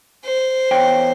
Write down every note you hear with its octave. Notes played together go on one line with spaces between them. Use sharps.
C5
E2 C#5 G5